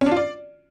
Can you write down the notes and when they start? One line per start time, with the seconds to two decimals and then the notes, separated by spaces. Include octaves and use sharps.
0.01 C#4
0.06 D4
0.11 F4
0.17 D5